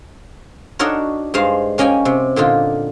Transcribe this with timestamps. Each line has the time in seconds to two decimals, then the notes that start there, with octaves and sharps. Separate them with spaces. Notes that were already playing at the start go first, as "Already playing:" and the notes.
0.79 D4 D#4 F#4 A4 A#4 C#5
1.34 G2 G#3 C5 F5
1.78 A#3 C#4 D#5 G5 G#5
2.05 C3
2.36 A#2 D3 D#4 F4